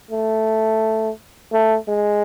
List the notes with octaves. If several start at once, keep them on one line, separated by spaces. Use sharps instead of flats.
A3
A3
G#3